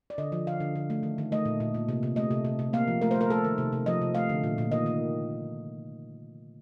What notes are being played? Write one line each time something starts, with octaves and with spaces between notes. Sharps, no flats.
D5
D3 D#5
F3
D3 F5
D3
D3
A3
D#3
D#3
A3 D#5
A#2
A#2
A#2
C3
C3
A3 D#5
C3
C3
C3
A#3 F5
F3
A3 A#4
C5
A3
A#4
A3 A4
D#3
C3
C3
F3 D#5
C3
A3 F5
D3
A#2
A#2
D#3 D#5
D#3